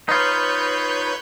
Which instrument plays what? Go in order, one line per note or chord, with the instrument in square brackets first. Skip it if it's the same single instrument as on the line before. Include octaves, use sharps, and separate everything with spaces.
[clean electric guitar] D#4 F4 [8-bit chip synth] B4 C#5 G6